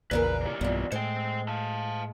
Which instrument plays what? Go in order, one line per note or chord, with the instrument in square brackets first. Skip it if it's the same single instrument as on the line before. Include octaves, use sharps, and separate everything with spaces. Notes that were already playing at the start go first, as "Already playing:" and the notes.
[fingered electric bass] A#1 E2 [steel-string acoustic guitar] A#2 C#3 A#4 [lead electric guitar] B4
[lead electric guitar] E3 G4
[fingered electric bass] B1 G2 [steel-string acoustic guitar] E2 A#2
[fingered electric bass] A2 [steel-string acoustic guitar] G#3 [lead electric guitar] C5 G5
[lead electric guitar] F5 A5